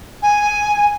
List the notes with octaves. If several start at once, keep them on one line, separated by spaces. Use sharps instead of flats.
G#5